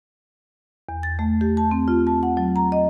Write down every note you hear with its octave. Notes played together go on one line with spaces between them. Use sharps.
E2
A6
A3
G4
A5
C4
F4
A5
F#5
F#3
A#5
D#5